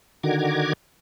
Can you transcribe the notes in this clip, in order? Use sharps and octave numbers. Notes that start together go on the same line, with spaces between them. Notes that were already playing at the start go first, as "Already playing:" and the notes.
D3 D#3 F#4 A#5 D6 G#6